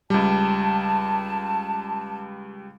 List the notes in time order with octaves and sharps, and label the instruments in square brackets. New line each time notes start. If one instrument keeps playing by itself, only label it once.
[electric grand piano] C#2 G3 [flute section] A5